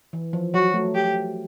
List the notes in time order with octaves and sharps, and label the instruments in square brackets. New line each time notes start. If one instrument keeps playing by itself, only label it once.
[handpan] E3
F3
[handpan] F#3 [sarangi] F#4
[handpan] A3
[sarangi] G4